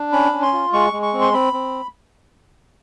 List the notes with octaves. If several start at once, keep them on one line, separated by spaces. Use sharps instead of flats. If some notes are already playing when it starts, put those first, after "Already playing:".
Already playing: D4
C#4 B5
C#4
C6
F4
G#3 C#6
G#3
C#6
C4
C6
C4 B5
C4